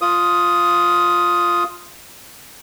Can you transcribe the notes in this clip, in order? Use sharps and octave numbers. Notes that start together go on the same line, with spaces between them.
F4 D#6